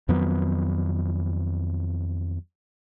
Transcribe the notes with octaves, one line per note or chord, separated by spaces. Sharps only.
F2 D#3 F#3 B3